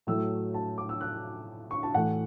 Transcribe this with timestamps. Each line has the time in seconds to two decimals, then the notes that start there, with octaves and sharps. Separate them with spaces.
0.07 A2 F#3 A3 E6
0.54 A5
0.78 D6
0.89 E6
1.01 F#6
1.71 C#6
1.83 A5
1.94 A2 E3 A3 F#5